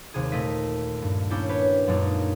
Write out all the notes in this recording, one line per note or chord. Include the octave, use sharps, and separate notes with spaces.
D#2 C3 G#4
A#2 A3 D#5 B6
G2
A#3 C#4 D4 E4 G4
G4 B4 C#5
F#2 A#2 G#3 A#3 D4 D#4